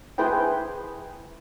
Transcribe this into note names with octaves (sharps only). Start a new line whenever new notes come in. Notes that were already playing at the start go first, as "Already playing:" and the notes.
E4 G#4 B4 C5 G5